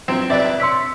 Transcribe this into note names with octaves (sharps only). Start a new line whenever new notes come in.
A#1 F#3 C4 E7
F2 C3 B4 D5 E5
C#5 C6 E6 B6 C#7